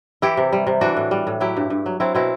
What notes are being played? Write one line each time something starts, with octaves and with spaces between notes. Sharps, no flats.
E3 E4 G4
C3
G3
C3
E3 D4 F#4
A2
G3
A2
F#3 E4 G4
G2
G2
F#3
F#3 C4 E4
B2 C4 E4